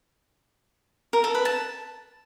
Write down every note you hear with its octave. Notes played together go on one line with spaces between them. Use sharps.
A#4
A4
B4
A5